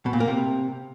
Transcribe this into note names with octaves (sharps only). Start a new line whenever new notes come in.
B2
A#2
A#3
C3